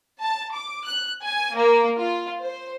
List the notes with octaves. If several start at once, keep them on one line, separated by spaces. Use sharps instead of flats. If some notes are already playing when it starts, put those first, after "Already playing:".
A5
D6
F#6
G#5
A#3
F4
C5